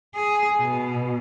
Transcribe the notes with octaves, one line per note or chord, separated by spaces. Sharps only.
G#4
B2